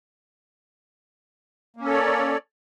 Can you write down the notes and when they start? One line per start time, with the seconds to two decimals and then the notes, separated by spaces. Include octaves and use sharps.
1.77 A#3
1.81 C#4
1.85 A4
1.89 C#5
1.93 D5